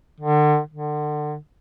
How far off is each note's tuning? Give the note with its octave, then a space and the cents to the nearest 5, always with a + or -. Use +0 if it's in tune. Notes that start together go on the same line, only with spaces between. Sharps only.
D3 +35
D3 +30